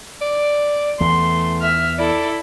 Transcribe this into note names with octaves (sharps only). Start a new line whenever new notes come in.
D5
E2 E3 A3 C6
E5 F6
E4 A4 D5